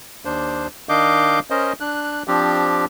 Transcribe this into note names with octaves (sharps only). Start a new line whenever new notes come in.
D#2 D4 C5
D#3 D4 D#5 F5 D6 G6
C#4 A#4 C5 D#5
D4 F#6
F3 C4 D4 G4